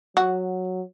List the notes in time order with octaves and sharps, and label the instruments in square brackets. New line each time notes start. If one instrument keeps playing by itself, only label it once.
[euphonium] F#3 [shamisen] F#4